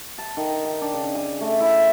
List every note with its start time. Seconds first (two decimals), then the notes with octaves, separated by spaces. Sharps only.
0.18 A5
0.37 D#3
0.65 G5
0.82 D4
0.94 C#3
1.15 G#5
1.41 A3
1.60 E4